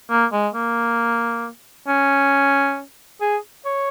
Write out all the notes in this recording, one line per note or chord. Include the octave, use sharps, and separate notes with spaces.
A#3
G#3
A#3
C#4
G#4
C#5